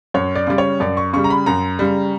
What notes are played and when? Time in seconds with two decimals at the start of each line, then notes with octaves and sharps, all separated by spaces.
0.14 F#2 C#5
0.35 D5
0.47 C#3 G3 D5
0.58 C#5
0.80 F#2 D5
0.97 C#6
1.13 C#3 G3 C#6
1.24 A#5
1.30 B5
1.46 F#2 A#5
1.79 C#3 G3